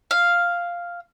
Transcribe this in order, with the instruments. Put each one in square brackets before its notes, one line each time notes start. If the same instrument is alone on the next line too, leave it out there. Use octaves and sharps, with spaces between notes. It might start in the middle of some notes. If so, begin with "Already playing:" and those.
[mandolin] F5